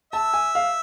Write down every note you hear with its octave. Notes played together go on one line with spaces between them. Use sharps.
E5 A5
G#5
F5